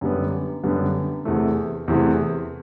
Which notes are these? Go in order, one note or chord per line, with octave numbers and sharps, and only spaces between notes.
F#2 D3 G3 B3
F#2 D3 G3 B3
E2 C3 E3 A3
E2 C3 E3 A3